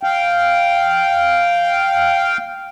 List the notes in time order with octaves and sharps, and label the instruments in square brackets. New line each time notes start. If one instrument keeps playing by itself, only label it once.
[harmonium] F5 G5